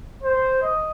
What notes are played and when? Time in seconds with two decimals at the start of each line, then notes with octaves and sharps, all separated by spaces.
0.23 C5
0.63 D#5